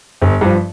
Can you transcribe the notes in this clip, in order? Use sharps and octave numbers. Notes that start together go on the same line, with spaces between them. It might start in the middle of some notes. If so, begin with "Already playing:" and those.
G1
G2 F3